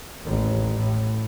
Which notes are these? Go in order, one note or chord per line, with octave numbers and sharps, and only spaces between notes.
A1 D#2
A2